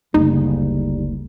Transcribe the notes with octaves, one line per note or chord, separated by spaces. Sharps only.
F#1 D2 G3 D#4